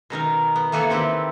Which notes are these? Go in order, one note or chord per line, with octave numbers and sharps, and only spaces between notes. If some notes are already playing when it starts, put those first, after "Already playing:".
B2 D#3 D#4 A#4
B3
E3 A#3 A4 B4 C#5
D#3 C4 E4 G4 B4